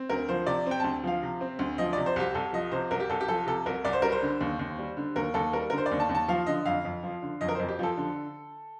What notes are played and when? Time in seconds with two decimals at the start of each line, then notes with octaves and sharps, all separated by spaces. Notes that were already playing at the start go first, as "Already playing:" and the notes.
Already playing: C4
0.10 D2 A#4
0.29 F3 C5
0.47 C3 D5
0.66 C4 G5
0.80 D2 A5
1.04 F3 F5
1.23 C3
1.41 C4
1.59 D2
1.78 F3 D#5
1.93 C3 D5
2.06 C5
2.16 C2 G4
2.34 C2 A4
2.53 F3 D#5
2.72 C3 C5
2.91 C2 A#4
3.00 G4
3.10 C2 A4
3.21 G4
3.28 F3 A4
3.47 C3 A4
3.66 C2 A#4
3.85 C2 D5
3.93 C5
4.02 G3 A#4
4.12 C5
4.22 D3
4.41 D#2
4.59 D#2
4.79 G3
4.97 D3
5.16 D#2 A#4
5.34 D#2 A4
5.53 G3 A#4
5.70 D3 A#4
5.78 C5
5.86 D5
5.91 D#2
6.00 A5
6.09 D#2
6.15 A5
6.28 F3 F5
6.47 D3 D#5
6.65 F2 F5
6.85 F2
7.03 F3
7.22 D3
7.41 F2 D#5
7.48 A#4
7.55 F2 C5
7.68 G4
7.79 F3 A4
7.97 D3